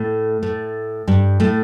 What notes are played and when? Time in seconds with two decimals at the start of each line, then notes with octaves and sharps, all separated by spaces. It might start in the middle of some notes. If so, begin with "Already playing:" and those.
Already playing: A2 A3
0.42 A2 A3
1.08 G2 G3
1.40 A2 A3